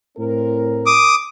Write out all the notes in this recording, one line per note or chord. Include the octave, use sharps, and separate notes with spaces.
A2 C4 A#4
D6 D#6